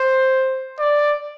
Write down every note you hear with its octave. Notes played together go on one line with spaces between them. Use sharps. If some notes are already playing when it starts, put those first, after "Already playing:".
Already playing: C5
D5